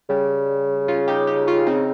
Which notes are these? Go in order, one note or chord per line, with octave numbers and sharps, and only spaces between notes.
C#3 G3
C#4 F4
D#4 G4
D#4 G4
C#4 F4
C4 D#4